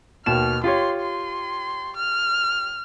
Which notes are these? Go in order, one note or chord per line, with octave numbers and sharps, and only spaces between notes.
D#2 B2 F6 E7
F4 G4 C#5 C6
C6
F6